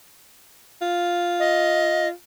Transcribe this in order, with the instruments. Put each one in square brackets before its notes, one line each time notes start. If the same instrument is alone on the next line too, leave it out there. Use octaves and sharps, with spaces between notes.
[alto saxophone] F4
[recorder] D#5